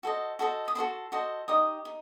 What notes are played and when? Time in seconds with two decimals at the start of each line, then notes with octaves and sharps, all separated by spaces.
0.03 F#4 A4 C5 D#5
0.39 F#4 A4 C5 D#5
0.68 D#6
0.75 F#4 A4 C5 D#5 C6
1.12 F#4 A4 C5 D#5
1.48 D#4 G4 D#5 D#6
1.85 D#4